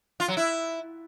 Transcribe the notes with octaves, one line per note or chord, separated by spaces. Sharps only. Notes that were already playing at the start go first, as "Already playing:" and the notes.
F4
F#3
E4